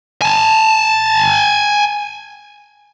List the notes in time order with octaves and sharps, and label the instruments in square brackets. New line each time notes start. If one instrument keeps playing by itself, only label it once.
[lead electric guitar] G#5 A5